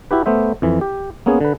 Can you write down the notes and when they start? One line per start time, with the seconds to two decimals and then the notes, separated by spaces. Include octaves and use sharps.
0.11 E4 F#4 G4 B4
0.26 A3 B3 C5 E5
0.62 F2 E3
0.81 G4
1.26 A#3 B3 C#4 G#4
1.41 D3 B4